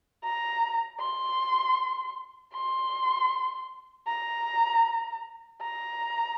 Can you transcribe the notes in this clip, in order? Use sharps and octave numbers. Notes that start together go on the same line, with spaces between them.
A#5
C6
C6
A#5
A#5